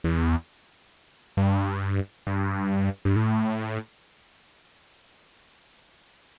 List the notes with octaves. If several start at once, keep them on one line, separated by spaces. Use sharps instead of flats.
E2
G2
G2
G2
A2